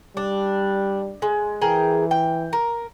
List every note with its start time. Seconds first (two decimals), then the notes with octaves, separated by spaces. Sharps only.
0.17 G3 D4
1.22 G#3
1.62 E3 G#4 A#4 G5
2.11 G5
2.53 A#4